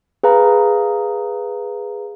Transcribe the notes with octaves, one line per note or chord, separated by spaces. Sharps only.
G#4 B4 F5 A#5